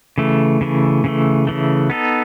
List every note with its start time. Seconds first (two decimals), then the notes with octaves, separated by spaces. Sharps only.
0.18 C#3 E3 A3
0.61 C#3 E3 A3
1.04 C#3 E3 A3
1.47 C#3 E3 A3
1.90 B3 D#4 A4